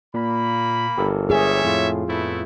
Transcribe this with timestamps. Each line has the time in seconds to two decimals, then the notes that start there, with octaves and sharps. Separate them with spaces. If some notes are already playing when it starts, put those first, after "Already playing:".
0.14 A#2 A#3 B5
0.98 G1 G4 A4 A#4
1.30 G3 G#4 C#5 E5
1.64 F2 A2 F4
2.08 A2 A3 B3 E4